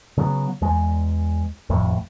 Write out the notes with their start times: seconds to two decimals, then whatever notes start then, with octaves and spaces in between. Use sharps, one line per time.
0.17 C#3 F#3 A3 B3
0.61 E2 G#3
1.69 G#1 F2 A2